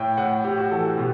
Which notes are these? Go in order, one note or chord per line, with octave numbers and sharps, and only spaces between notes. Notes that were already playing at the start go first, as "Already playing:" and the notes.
Already playing: A2 G5
A2 F#5
A2 G4
F#4
E3 A4
F#4
B2 G4